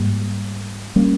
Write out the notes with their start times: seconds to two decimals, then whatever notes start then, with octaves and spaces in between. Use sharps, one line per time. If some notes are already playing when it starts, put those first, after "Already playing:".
Already playing: G#2 G3 A#3
0.96 G3 A#3 C#4